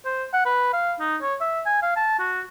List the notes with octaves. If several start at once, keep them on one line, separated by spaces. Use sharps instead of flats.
C5
F#5
B4
F5
D#4
C#5
E5
G#5
F5
A5
F#4